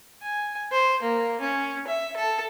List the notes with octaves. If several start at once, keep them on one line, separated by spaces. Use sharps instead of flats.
G#5
C5
A#3
C#4
E5
A4